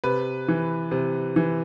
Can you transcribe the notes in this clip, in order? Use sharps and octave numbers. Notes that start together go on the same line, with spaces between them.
C3 B4
E3
C3
E3